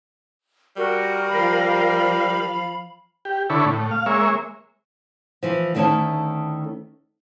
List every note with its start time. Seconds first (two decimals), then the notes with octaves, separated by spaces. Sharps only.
0.77 G3 F#4 A#4
1.29 F3 F5 B5
1.65 B5
3.25 G4
3.50 D3 E4 A4 C#5 B5
3.66 A2
3.91 F5
4.06 G#3 A#3 C#5 E5
5.43 E3 F3
5.75 D2 D#3 A3 C#4 E4 A5